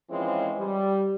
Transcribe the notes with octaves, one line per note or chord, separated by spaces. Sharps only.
E3 F3 G#3 C4 C#4
G3